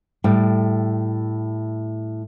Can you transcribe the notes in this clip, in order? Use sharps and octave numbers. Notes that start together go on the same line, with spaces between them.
A2 G3 G5